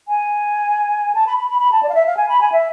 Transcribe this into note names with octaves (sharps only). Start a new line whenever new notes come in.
G#5
A5
B5
B5
B5
B5
A5
D5
F5
E5
F5
G#5
B5
G#5
E5